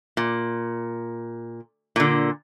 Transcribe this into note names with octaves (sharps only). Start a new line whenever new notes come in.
A#2
A#2 D3